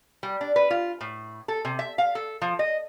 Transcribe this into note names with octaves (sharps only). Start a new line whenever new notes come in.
G3
D4
B4
F4
A2
A4
C3
E5
F5
A4
F3
D#5